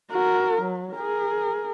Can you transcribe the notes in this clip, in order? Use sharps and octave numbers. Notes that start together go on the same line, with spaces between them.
F#4 A#4
F#3
G#4 A#4